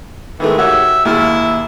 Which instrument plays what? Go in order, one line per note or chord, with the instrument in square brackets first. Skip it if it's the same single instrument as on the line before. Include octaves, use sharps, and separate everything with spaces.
[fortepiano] D#3 G#3 A3 [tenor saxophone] E3
[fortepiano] F#4 G4 C#5 [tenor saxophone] E5
[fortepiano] D#2 G#3 F6 [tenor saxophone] E4